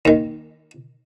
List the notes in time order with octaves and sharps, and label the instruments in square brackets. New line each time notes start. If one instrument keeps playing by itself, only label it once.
[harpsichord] D#2 D#3